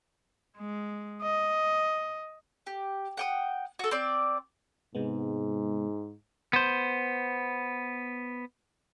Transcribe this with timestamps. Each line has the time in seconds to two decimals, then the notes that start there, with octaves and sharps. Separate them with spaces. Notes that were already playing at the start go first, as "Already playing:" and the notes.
0.57 G#3
1.22 D#5
2.67 G4
3.17 F#5 G5 D#6
3.79 F#4 A4
3.91 C4 D5
4.95 G#2 C3 G#3 B3
6.53 B3 C5